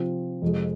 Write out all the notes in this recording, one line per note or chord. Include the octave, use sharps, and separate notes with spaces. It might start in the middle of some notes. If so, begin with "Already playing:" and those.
Already playing: C3 F3 C4 F4
F2 C3 F3 G#3